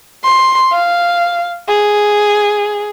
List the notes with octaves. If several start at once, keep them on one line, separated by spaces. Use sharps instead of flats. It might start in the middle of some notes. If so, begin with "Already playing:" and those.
C6
F5
G#4